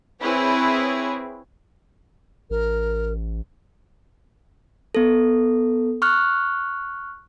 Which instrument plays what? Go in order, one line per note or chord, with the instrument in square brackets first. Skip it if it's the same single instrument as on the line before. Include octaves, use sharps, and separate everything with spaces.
[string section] C4 E4 G#4 B4 C#5
[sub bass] A1 [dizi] A#4
[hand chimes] B3 A4
C#6 F6 F#6